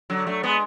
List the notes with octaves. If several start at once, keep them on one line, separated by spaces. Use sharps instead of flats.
D3 F#3
F#3 A3
G#3 B3